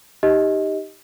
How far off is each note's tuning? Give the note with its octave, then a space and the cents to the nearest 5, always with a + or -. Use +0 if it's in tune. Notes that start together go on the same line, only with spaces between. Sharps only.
D#4 +0 G4 +0 D#5 +15